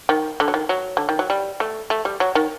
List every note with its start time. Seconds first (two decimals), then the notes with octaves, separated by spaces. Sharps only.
0.09 D#3
0.40 D3
0.48 F#3
0.54 D#3
0.69 F#3
0.97 D3
1.09 D#3
1.19 F#3
1.30 G3
1.60 A3
1.90 A3
2.05 G3
2.20 F#3
2.35 D#3